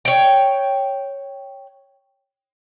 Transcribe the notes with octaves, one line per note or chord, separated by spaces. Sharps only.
C#5 G5